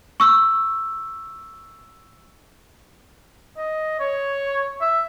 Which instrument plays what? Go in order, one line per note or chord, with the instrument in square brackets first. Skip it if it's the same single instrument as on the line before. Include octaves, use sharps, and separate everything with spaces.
[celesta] C#6 E6
[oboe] D#5
C#5
E5